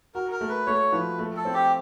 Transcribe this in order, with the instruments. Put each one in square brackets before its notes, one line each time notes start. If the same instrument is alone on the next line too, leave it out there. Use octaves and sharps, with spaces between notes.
[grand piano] F#4 [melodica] A#4
[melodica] A#4
[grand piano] A3
[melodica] B4
[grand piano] A3 [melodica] C#5
[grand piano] F3 [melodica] B4
[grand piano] A3
[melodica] A4
[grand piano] C4
[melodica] G4